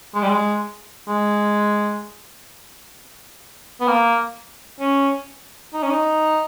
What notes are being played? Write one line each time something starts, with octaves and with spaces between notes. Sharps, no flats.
G#3
G3
G#3
G#3
B3
A#3
C#4
D#4
C#4
D#4